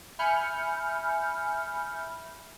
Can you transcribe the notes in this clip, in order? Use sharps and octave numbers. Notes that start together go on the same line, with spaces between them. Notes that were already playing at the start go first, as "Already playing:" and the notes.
E5 G#5 B5 F6 G6 C#7